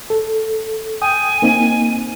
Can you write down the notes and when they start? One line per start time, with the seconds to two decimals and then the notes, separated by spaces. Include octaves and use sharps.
0.10 A4
1.02 G5 G#5 D#6
1.42 A#3 C4 D#4